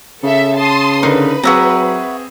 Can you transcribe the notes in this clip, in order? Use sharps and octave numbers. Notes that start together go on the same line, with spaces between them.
C#3 A4 E5
A5 C6 D#6
D3 D#4 A#4 B4
F#3 C4 F#4 G#4 E5 A#5